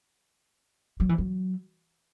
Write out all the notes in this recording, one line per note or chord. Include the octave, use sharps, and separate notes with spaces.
F#3
E3
F#3